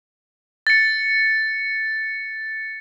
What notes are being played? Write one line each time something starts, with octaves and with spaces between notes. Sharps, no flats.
A6 C#7